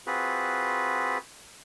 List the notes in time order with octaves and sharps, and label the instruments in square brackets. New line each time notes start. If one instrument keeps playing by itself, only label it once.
[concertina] C4 F4 F#4 G#4 B4